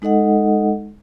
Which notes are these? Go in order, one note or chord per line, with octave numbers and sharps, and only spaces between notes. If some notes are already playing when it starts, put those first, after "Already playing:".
G#3 D#4 A4 D#5 F#5